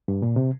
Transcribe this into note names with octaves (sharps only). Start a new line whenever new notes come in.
G2
A#2
C3